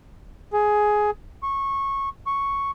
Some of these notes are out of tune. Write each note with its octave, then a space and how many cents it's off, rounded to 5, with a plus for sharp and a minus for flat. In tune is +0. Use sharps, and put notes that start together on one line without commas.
G#4 +10
C#6 -15
C#6 +0